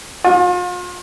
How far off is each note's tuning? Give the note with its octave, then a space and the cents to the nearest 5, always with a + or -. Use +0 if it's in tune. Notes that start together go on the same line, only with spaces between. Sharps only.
F4 +40